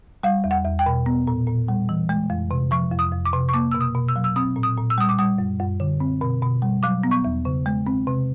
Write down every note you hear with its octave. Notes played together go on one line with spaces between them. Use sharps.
G3 F5
E2
F#5
E2
G5
B2
B3
A#2
A#2
G3
E3
G#3
F2
C3
F3 C#6
F2
D#6
F2
D6
C3
C#6
A#3 D6
B2 E6
D#6
B2
E6
F#3
E6
C4 D#6
A#2
D#6
A#2
E6
G3 D#6
D6
G3 D#6
F#2
F#2
D3
C4
B2
B2
G3
F#3 D6
B3
C#6
E2
C#3
G#3
C4
C3